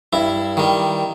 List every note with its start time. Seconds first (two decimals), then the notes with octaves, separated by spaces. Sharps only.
0.13 G2 E4
0.57 D#3 G3